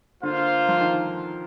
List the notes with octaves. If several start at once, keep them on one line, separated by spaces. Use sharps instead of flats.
D3 A#3 F4 C5 F5
F3
D#3